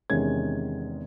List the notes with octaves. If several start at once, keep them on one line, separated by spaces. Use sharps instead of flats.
E2 C3 D#3 G#3 C#4 G#6